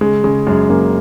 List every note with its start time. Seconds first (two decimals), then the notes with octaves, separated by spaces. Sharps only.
0.01 C#3 G#3
0.24 C#3 G#3
0.47 F#2 G#3
0.69 F#2 A#3